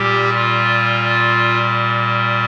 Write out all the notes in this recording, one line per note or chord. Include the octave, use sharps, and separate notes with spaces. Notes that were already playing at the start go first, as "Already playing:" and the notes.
Already playing: A#2 G3 G4
F4